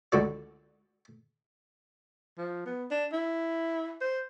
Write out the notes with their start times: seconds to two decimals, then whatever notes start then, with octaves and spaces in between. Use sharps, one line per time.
0.12 C#2 D3 F#4 D5
2.38 F3
2.66 B3
2.91 D4
3.13 E4
4.01 C5